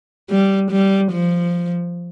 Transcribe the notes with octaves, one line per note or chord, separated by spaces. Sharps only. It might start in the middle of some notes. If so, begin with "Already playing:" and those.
G3
G3
F3